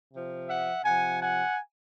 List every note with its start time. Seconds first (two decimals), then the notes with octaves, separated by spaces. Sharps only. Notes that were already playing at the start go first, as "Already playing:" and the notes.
0.13 C3 F3
0.48 E5 F#5
0.84 C3 F3 F#5 G#5
1.21 F#5 G#5